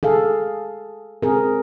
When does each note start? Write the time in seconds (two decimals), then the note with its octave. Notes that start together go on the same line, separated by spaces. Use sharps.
0.03 G#4 A4 F5
1.23 C4 G#4 A#4